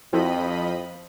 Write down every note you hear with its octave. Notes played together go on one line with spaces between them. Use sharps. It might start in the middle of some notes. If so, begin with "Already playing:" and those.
F2 F3 C4 E4 F#4 A4 D#5 B5